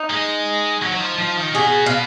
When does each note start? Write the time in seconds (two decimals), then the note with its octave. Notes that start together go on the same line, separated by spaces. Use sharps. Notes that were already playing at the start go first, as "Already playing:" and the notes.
Already playing: D#4
0.10 G#3
0.82 F#3
0.92 F#3
1.00 F3
1.19 F3
1.37 D#3
1.55 B2 G#4
1.86 F4